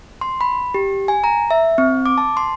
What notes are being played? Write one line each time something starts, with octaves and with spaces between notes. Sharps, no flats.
C6
B5
G4
G#5
A#5
E5
C4
D6
A5
C6